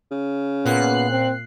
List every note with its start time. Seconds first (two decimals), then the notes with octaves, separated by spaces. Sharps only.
0.11 C#3
0.65 A#2 B3 F#6 C7
1.11 C4